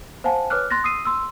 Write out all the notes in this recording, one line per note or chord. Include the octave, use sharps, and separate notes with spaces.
C5 F5 F#5 G#5 A5
B4 C#5 D6 F6 F#6
C6 F#6 A6 A#6
D#6 E6 C7 D#7
C6 E6